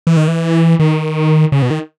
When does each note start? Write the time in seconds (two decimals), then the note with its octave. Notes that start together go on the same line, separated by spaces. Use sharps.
0.07 E3
0.17 D#3
0.28 E3
0.79 D#3
1.52 C#3
1.62 B2
1.71 D#3